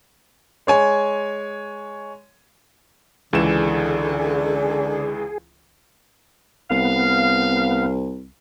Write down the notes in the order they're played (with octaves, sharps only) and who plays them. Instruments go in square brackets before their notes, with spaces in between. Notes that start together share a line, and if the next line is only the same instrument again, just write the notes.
[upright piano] G#3 C#5 G#5
[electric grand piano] C#2 E3 E7 [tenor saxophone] D3 [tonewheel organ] G#4
[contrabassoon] C2 [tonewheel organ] B3 [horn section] F5